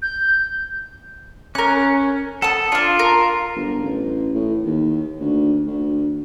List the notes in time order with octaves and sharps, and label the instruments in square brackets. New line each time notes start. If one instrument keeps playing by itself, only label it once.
[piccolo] G6
[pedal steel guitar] C#4 [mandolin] A#4 F#6
[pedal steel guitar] A4 [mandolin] F#5 A5 D#6
[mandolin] D4 F5 [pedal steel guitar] F4
[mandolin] A#4
[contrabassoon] G1
A1
A2
D#2
D2
D2